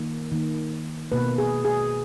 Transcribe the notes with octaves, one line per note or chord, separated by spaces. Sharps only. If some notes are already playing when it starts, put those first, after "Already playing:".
Already playing: D#3 A#3
D#3 A#3
B2 A#3 B4
G#4
G#4